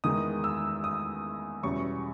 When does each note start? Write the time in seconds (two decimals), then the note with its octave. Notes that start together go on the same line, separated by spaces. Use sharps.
0.04 E2 D#3 G#3 D#6
0.44 E6
0.84 D#6
1.63 E2 B2 G3 C#4 C#6